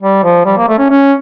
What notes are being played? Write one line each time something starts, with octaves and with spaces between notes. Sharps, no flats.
G3
F3
G3
A#3
A3
C#4
C#4